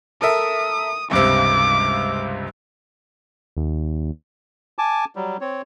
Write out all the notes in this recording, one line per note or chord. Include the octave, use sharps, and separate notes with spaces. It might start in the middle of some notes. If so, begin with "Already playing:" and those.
A4 A#4 E5 D#6
C#2 G2 C3 D6
D#2
G#5 A5 D6
F#3 G3
C4 C#5